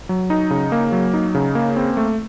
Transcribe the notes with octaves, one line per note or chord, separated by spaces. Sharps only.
F#3
D#4
C#3
A#3
F#3
D#4
C#3
A#3
C4
A3